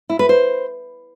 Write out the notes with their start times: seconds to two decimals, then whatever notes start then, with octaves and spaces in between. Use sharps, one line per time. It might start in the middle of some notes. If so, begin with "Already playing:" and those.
0.10 E4
0.19 B4
0.29 C5